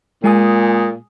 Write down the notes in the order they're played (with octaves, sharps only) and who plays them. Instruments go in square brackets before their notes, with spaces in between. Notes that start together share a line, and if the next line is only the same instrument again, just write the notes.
[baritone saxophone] A#2 [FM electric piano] G#3 G#5 D#6